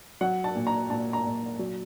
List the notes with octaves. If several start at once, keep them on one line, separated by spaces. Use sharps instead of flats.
F#3 F#5
A5
A#2
A#5
A#2 A5
A#5
A#2
F#3